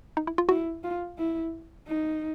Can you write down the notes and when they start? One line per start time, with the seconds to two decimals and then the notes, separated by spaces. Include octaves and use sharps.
0.17 D#4
0.27 E4
0.38 F4
0.49 E4 F#4
0.84 F4
1.18 E4
1.88 D#4